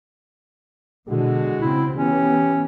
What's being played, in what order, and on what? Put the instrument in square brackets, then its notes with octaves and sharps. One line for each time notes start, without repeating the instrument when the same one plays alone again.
[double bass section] B2 D3 E3 [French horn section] G#3 F#4
[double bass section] C#3 C4 [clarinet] E4
[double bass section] E3 B3 [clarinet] C#4 [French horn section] G4 C#5